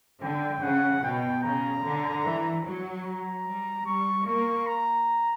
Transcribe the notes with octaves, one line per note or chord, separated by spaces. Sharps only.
D3 G5
C#3 F#5
B2 G5
C#3 A#5
D3
E3
F#3
A#5
G3
G3 C#6
A#3 C#6
A#5